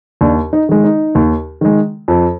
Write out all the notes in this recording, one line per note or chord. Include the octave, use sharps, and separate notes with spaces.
D#2 D4
D#4
D#3 G#3
D#4
D#2
D#3 G#3
F2